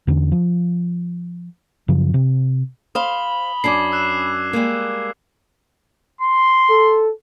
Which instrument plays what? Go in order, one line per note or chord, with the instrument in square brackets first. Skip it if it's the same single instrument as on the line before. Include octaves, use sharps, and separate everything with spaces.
[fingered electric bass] E2 D3 C#4
F3
F#2 C#3 F3
C3
[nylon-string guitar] C5 F5 [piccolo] B5 [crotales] D#6 G7
[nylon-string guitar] F#2 C#4 D4 [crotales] D6 G#6 C7
[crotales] E6 F#6 E7
[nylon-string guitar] G3 G#3 A#3
[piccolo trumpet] C6
[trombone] A4